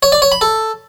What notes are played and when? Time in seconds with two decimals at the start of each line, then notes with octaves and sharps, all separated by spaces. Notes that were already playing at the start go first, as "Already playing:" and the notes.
0.03 C#5
0.12 D5
0.22 C#5
0.32 B5
0.41 A4